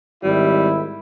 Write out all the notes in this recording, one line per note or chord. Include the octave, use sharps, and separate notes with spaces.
G#1 G3 E4